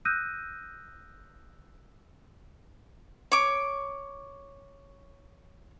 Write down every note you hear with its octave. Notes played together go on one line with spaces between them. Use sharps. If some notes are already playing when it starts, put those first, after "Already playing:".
D#6 E6 F#6 G6 A#6 D#7
C#5 D6